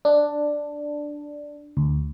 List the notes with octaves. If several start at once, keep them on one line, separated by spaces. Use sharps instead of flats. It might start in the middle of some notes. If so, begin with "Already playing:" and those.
D4
D2